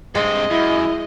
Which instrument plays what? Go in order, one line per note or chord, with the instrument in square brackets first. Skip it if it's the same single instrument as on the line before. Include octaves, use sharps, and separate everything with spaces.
[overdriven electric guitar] G2 C4 [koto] G#3 [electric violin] D#5
[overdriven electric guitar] F#2 [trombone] E4